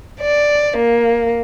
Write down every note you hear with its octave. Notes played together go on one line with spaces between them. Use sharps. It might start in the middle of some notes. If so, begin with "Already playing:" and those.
D5
A#3